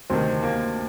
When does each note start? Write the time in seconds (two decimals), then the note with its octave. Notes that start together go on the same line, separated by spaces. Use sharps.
0.10 D2 C3 D#3 C4
0.43 A#3